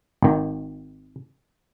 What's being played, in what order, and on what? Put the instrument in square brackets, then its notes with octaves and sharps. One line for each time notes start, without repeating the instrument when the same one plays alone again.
[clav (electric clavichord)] G#1 D#3